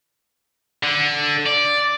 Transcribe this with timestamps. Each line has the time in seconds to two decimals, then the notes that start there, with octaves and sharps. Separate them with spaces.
0.83 D3
1.46 D5